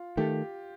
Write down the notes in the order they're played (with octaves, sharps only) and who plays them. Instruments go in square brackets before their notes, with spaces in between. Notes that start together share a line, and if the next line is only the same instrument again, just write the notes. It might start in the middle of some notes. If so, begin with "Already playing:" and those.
Already playing: [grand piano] F4
[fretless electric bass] D#3 A3 [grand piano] G4